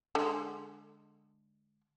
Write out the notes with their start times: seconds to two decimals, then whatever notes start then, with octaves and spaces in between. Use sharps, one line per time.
0.15 D3 G#3